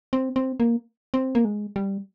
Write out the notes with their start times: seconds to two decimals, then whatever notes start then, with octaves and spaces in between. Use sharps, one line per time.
0.13 C4
0.36 C4
0.60 A#3
1.14 C4
1.35 A#3
1.45 G#3
1.76 G3